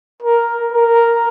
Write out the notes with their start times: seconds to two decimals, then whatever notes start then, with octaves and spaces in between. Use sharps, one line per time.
0.23 A#4
0.72 A#4